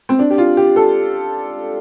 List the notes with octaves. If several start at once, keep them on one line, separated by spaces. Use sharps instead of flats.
C4
D4
G4
F4
G4
A4